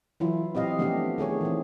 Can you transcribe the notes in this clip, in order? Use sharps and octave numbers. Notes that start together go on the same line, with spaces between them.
E3 F#3 E4 F4
C4 G4 D#5 F5
F3 A3 B3 C#4 D4 G4
D#3 A3 G#4 C#5
E3 C4